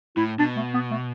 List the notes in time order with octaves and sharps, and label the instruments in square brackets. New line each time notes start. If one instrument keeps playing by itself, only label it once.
[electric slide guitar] A2 [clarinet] E4
[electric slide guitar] B2 [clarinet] D4
[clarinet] A3
B3
A3